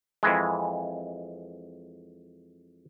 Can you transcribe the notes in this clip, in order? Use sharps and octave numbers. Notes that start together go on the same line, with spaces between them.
F2 E3 G#3